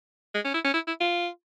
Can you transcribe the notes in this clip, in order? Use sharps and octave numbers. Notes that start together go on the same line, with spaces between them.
G#3
C#4
E4
C#4
E4
E4
F4